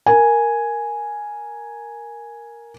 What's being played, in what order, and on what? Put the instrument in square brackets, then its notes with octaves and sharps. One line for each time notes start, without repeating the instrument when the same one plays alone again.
[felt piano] A#4 G#5